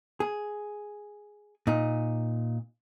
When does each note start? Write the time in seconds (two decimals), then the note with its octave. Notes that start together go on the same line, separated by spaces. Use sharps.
0.20 G#4
1.67 A#2 D#4